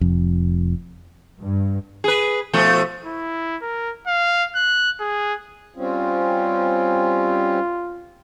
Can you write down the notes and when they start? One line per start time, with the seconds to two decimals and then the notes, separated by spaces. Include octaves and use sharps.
0.01 F1 F2
1.41 G2
2.04 G#4 B4
2.53 B2 F3 A3
3.05 E4
3.62 A#4
4.07 F5
4.55 F#6
5.00 G#4
5.77 G3 C4 C#4 F4